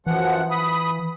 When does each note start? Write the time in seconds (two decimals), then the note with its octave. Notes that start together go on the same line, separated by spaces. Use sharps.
0.06 F#2 E3 F3 F#5
0.50 B5 D#6